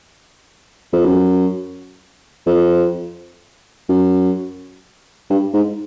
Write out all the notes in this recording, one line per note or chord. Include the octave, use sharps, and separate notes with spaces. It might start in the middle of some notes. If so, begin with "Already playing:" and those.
F2
F#2
F2
F#2
G2
G#2